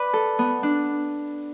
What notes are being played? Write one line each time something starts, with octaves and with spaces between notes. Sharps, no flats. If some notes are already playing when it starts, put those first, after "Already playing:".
Already playing: B4 D5
A4
B3
D4